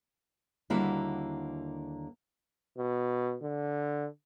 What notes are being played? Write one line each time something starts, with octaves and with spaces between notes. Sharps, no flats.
D#2 D3 G3 A#3 E4 F#4
B2
D3